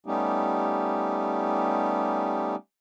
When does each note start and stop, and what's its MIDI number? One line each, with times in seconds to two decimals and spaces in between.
0.06 2.56 55
0.06 2.56 57
0.06 2.56 59
0.06 2.56 61
0.06 2.56 63
0.06 2.56 67